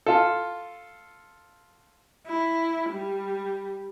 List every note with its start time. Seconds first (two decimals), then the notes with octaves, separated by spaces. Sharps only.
0.06 F4 A4
2.26 E4
2.90 G3